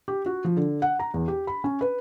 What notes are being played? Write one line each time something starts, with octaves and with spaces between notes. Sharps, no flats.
G4
F#4
F3
D3
F#5
A#5
E2
G4
B5
C#4
B4